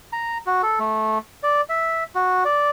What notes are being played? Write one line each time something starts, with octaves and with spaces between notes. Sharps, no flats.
A#5
F#4
A4
A3
D5
E5
F#4
D5